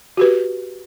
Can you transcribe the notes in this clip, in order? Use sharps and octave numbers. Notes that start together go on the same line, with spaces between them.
F#4 G4 B4